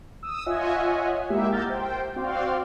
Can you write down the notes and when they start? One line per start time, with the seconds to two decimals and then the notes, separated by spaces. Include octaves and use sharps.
0.23 D#6 E6
0.46 F4 C#5 D#5 E5 F#5 G#5
1.30 G#3 A#3 E4 G4 E5
1.52 F#5 A#5 E6 F6 G6 A6
1.67 C5 G5
2.16 C4 F#4 D5 F5 G5 C6